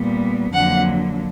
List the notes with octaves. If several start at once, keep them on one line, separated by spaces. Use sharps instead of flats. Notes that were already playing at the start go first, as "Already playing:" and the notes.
Already playing: A#2 G3 B3
F2 D3 F#3 A#3 F#5